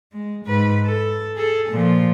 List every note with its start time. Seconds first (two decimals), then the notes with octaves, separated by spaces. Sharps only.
0.13 G#3
0.45 G#2 B4
0.85 A4
1.35 G#4 A4
1.69 A#2 F3